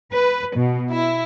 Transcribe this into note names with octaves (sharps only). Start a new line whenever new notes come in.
B4
B2
E4